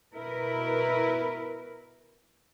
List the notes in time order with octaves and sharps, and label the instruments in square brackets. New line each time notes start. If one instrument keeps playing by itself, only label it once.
[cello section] B2 E4 A#4 B4